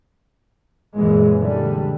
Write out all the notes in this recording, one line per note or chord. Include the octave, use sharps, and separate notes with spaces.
F#2 A#2 E3 G#3
D3 G3